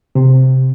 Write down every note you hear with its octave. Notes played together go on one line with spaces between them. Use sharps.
C3